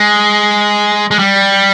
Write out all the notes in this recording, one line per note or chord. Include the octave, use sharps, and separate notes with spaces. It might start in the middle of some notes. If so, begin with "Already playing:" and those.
Already playing: G#3
G#3
G3